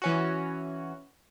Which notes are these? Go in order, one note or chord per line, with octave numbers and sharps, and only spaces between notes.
E3 C#4 F#4